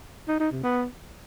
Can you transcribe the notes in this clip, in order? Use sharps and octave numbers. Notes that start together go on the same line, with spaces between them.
D#4
D#4
C3
B3